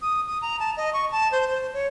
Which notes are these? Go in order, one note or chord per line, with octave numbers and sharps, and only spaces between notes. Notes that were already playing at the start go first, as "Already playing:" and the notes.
D#6
D#6
A#5
A5
D#5
C#6
A5
C5
C5
C#5